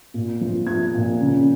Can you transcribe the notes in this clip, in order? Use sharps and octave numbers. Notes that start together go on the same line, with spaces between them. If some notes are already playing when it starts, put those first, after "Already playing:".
A#2
F3
F3 G#6
A#2
C#3